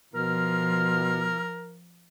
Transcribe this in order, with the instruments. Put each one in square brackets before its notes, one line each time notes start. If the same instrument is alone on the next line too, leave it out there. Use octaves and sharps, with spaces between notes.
[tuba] B2 [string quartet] F3 [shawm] A#4 [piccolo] F6